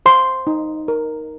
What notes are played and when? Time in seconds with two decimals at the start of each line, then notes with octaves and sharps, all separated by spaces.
0.06 C5 C6
0.47 D#4
0.88 A#4